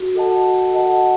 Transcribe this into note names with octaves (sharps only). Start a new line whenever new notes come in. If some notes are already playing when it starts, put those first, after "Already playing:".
Already playing: F#4
A4 D#5 F#5 A5
F#4
A4 D#5 F#5 A5